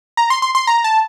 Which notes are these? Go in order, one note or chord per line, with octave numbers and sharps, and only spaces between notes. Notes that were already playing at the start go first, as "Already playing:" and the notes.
A#5
C6
C6
C6
A#5
A5